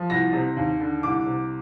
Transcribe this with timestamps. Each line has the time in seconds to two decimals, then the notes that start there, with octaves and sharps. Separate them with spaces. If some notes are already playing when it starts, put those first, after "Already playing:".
Already playing: F3
0.10 C2 A#6
0.33 C3
0.57 D#2
0.80 D3
1.03 C2 D6
1.26 C3